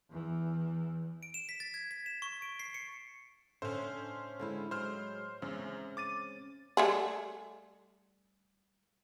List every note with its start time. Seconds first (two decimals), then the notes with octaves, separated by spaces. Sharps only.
0.10 E2 E3
1.23 D7
1.34 E7
1.49 B6
1.60 A6
1.74 G#6
1.91 B6
2.06 E7
2.22 C#6
2.42 D7
2.60 C7
2.74 C#7
3.62 A2 D3 C#4 C5 E5
3.82 D4
4.39 D3 G#3 E4
4.71 F#3 G#3 C5 F6
5.42 E2 G#3 C4 C#4 E5
5.97 D6 A6 D#7
6.77 G3 A3 G#4